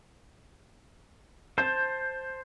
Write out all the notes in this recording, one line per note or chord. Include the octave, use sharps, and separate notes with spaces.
C5 A5 G6